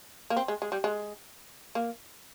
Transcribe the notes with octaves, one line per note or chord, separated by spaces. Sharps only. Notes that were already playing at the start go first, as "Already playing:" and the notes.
A#3
C4
G#3
G#3
G3
G#3
A#3